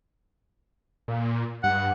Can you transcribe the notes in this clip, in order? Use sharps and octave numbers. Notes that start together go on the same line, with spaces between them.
A#2
G2 F#5